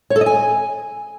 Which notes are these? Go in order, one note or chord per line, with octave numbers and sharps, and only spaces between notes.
C#5
A4
D#5
G#5